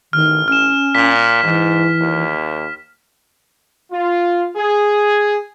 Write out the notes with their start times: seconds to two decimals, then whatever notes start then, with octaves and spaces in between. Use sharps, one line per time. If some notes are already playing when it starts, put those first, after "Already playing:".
0.13 A1 D#3 F6
0.48 C#4 F6 E7
0.95 A#2 B6
1.44 G#2 E3
2.00 D#2
3.91 F4
4.56 G#4